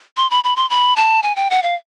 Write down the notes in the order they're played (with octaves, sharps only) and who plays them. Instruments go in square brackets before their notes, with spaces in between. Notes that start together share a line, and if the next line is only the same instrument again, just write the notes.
[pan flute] C6
B5
B5
C6
B5
A5
G#5
G5
F#5
F5